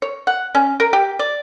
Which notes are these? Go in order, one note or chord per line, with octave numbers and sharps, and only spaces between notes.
C#5
F#5
C#4
A#4
G4
D5